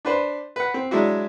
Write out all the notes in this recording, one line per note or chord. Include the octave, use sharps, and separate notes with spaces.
D4 B4 C5
B4 F#5
C4
F#3 G#3 D4 E4 F#4